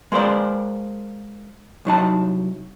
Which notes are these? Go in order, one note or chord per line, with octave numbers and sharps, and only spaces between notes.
G#3 A#3 A#4 C5 D5
C2 F#3 D#4 A5